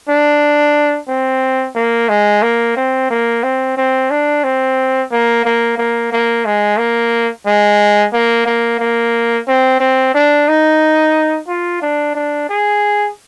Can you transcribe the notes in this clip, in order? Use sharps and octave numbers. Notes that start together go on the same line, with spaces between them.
D4
C4
A#3
G#3
A#3
C4
A#3
C4
C4
D4
C4
A#3
A#3
A#3
A#3
G#3
A#3
G#3
A#3
A#3
A#3
C4
C4
D4
D#4
F4
D4
D4
G#4